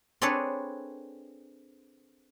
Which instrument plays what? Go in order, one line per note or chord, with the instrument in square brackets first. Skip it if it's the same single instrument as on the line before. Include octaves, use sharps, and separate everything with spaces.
[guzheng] C4 D4 G#4 A4 B4 C#5